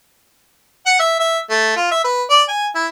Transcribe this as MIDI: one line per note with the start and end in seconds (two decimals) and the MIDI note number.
0.86 0.95 78
0.99 1.17 76
1.19 1.39 76
1.50 1.74 57
1.77 1.88 65
1.91 2.04 76
2.04 2.22 71
2.30 2.43 74
2.48 2.66 80
2.75 2.87 64